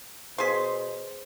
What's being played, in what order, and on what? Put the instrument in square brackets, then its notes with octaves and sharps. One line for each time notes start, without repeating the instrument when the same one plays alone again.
[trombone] B2 [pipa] G#4 C6 [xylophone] C5 B6